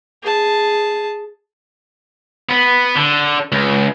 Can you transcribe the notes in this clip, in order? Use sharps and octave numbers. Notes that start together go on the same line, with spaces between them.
G#4 A5
B3
D3
C#2